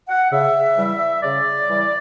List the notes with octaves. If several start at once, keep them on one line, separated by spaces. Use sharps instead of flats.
F#5
C#3 E5
E3 G3
C#3 D5
E3 G3